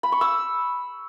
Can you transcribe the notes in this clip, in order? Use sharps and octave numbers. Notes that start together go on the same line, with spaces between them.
B5
C#6
E6